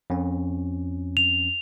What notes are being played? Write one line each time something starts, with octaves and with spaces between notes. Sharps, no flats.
F2 C#4
F7